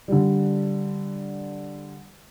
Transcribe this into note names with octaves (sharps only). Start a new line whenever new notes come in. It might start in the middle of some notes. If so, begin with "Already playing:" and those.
D3 G3